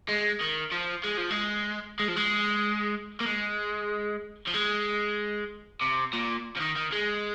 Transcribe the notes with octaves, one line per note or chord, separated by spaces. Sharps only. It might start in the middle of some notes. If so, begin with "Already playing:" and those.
G#3
D#3
F3
G#3
F3
G#3
G#3
F3
G#3
A#3
G#3
F3
G#3
C3
A#2
F3
D#3
D#3
G#3